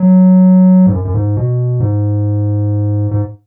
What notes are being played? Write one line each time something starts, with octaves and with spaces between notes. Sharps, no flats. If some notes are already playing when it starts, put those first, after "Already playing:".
Already playing: F#3
G#2
F#2
F#2
G#2
B2
G#2
G#2